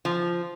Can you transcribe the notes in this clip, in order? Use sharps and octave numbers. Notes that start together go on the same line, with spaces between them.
F3